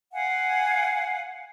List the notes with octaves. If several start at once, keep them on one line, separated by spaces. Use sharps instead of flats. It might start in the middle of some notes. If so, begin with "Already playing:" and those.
F5 F#5 G#5